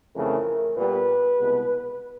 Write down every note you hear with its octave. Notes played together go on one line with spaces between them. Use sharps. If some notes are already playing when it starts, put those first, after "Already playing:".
F2 C#3 E3 A3 C4 A#4
A#2 G3 B3 B4
C2 B2 G#3 B3